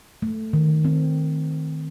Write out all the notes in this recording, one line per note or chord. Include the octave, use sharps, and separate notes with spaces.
A3
D#3
C4